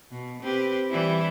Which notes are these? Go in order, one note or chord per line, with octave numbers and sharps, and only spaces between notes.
B2
C4 G4 B4
E3 G3 E4